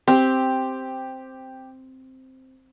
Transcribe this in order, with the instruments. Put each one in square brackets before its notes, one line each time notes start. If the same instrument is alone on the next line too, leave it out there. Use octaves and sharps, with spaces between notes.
[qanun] C4 [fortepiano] G4